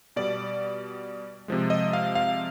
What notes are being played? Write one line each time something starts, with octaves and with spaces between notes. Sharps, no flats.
B2 G3 D5
C3 F3 G#3
D#5
F5
F5